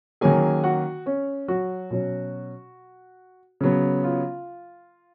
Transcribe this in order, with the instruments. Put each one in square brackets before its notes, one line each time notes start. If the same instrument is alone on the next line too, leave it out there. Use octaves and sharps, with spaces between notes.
[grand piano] D#3 F#3 A#3 C#4 G#4 G#5
F#4 F#5
C#4 C#5
F#3 F#4
B2 F#3 C#4
C#3 F#3 B3
F4